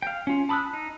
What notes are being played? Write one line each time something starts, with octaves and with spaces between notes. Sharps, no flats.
F5 G5
C#4 F4
A5 B5 D#6 E6 F#6
D#4